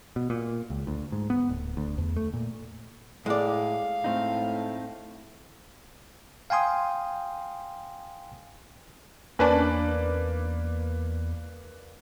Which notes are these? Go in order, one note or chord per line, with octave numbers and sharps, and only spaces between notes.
B2
A#2
C#2
D2
G#2
B3
D1
D2
E2
A3
A#2
A2 G#3 D5 F5
A2 A3 C4 D#4
F5 G5 G#5 C6 D#6
E2 A#3 C#4 D4 B4 D5